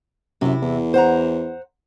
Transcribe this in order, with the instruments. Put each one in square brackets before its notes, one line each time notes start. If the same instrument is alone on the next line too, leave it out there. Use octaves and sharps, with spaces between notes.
[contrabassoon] F#2 [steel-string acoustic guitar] C3 E4
[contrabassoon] E2
[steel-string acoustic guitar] C5 F#5 A#5